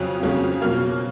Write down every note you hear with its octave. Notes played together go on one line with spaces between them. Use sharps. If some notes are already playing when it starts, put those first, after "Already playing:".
Already playing: F2 C#3 F#3 C#4 F#6
F2 C#3 F#3 C#4
B2 F#3 A#3 F6